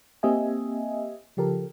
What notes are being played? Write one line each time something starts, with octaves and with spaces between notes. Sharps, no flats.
A#3 C4 G4 D#5 E5 G#5
C#3 F3 G4 A4 A#4